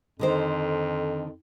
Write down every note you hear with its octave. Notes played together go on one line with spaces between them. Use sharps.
F2 D3 D#3 C5